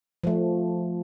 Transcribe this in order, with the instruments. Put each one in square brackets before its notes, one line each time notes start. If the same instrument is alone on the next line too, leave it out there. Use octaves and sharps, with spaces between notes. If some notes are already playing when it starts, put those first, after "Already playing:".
[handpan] F3 A3